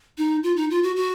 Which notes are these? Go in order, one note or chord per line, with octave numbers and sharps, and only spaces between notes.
D#4
F4
D#4
F4
F#4
F#4